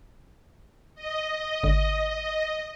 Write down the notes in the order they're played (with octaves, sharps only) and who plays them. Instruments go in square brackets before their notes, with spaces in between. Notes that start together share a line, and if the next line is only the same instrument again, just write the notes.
[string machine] D#5
[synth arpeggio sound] G#1 D3